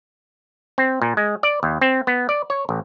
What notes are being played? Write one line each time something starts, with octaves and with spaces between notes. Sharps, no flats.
C4
A#2
G#3
D5
D#2
C4
B3
D5
C#5
A1